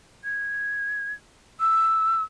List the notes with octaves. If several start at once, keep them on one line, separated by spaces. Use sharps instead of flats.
G#6
E6